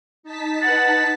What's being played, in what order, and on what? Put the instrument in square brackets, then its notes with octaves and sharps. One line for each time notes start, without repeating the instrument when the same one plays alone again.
[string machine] D#4 A5 B6
[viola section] B4 F#5 [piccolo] A6